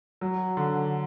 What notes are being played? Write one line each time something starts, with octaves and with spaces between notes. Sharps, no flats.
F#3
D3